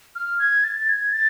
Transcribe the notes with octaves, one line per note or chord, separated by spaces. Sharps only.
F6
G#6
A6
G#6
A6